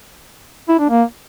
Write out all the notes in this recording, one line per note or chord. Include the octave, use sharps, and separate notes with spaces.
E4
D4
A#3